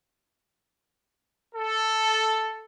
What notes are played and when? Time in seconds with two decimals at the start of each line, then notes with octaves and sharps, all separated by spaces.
1.55 A4